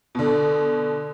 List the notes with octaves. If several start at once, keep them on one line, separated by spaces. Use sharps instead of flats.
B2 D3